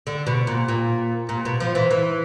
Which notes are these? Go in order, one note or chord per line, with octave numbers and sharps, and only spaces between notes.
D3
B2
A#2
A#2
A#2
B2
F3
E3
E3